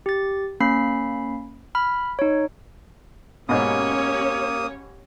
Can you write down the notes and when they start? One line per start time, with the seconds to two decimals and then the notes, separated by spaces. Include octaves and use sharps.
0.06 G4 A6
0.60 A#3 C#4 B5 C7
1.75 B5 F6
2.19 D#4 C#5
3.49 G#2 B2 A#3 C#4 G4 C#5 D#6